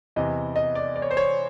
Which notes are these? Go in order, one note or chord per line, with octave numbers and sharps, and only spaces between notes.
E2 C3 E3 D#5
D#5
D5
D5
C#5
C5
C#5